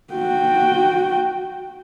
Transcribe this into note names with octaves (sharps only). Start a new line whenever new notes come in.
F#4 G5